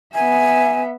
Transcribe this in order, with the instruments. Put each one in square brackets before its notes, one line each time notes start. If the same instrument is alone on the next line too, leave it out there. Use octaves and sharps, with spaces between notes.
[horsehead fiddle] B3 E5 [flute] G#5